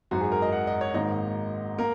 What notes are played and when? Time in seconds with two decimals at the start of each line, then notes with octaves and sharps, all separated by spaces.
0.11 G#1 F#2 F#3 F#4
0.21 G#4
0.32 A#4
0.42 D#5
0.52 F#5
0.67 D#5
0.81 C#5
0.94 G#1 G#2 D#3 A#3 D#5
1.78 A#3 A#4